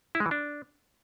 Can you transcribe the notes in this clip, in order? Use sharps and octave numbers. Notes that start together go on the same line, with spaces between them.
E4
G#3
E3
D4